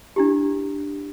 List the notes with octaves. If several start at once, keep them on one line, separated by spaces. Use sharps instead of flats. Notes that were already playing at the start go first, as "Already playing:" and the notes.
D4 E4 G4